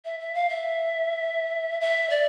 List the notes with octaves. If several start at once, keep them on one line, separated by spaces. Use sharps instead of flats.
E5
E5
F5
E5
E5
D5